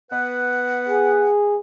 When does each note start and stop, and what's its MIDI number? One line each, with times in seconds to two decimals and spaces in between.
0.11 1.29 59
0.11 1.29 71
0.11 1.29 78
0.89 1.59 68